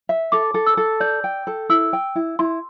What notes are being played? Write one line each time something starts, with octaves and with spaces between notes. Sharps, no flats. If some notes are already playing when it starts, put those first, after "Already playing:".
E5
A4 D6
A4
E6
A4
D5 G6
G5
A4
E4 E6
G5
E4
E4 C6